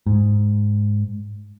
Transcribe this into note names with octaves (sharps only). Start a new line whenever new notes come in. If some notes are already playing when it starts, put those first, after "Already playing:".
G#2